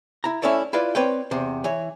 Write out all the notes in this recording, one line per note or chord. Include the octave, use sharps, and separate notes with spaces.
E4 A#5
A3 C#4 E4 A4 C#5 D5
E4 F4 B4 D5
C4 B4 C#5 D5 G5
E2 C3 C5
E3 C#5